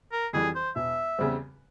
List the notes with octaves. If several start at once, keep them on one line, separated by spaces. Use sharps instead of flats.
A#4
F2 E3 G3 G#4
C5
E1 E5
E2 C#3 G3 C4